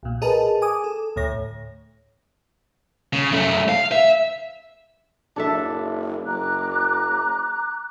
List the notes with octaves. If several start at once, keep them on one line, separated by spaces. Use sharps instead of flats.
B1 A#2
G#4 A#4 B4 D#5 A5
G#5 D6 D#6
A4
D2 A2 C#5 A#6
C#3
F#2 A3
F5
E5
F#1 D4 A4 E5
F#1 A#5 D6 F#6